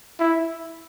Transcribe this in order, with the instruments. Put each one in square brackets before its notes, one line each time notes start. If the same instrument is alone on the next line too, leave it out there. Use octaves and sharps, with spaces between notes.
[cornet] E4